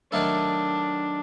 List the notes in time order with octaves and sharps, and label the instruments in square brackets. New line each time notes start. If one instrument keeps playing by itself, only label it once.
[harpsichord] D#3 F#3 A3 D#4 A4 [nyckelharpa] D4